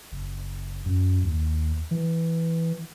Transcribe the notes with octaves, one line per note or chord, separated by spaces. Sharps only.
F#1
F#2
D#2
E3